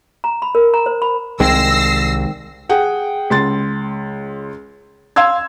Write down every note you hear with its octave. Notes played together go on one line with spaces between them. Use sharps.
A#5
B5
A#4
A#5
C5
B5
C2 D#3 G#3 C4 E6 A#6 C7
G#4 F#5 G5
C#2 C6 A6
F5 C6 E6 G#6